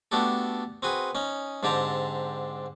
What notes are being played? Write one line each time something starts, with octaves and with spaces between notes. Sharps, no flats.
A3 B3 D4 F#4 G4 A4
C4 F#4 G#4 B4
C#4 D#4
G#2 D3 C4 G4 A5 A#5